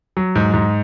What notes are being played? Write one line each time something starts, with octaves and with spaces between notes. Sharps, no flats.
F#3
G#2
G#2